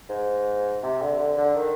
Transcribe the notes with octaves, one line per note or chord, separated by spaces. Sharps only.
G#2
C3
D3
D3
D3
D#3